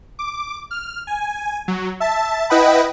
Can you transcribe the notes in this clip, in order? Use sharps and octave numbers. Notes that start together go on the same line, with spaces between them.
D6
F6
G#5
F#3
E5 A5
E4 B4 D#5 F#5 G5 B5